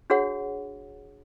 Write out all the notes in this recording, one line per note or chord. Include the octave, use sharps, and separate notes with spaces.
D4 F#4 G#4 C#5 F#5